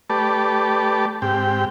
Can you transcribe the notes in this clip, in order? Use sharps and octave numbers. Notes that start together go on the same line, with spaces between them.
A3 G4 B4 D5 A5
G#2 C4 G4 G5